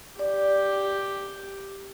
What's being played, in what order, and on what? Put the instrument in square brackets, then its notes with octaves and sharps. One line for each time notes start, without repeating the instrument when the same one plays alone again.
[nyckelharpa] G4 [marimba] D5